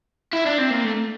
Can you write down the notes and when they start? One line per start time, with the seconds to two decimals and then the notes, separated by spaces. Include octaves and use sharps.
0.33 E4
0.46 D4
0.58 C4
0.71 A#3
0.84 A3